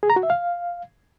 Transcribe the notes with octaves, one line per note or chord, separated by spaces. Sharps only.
G#4
A#5
F#4
E5
F5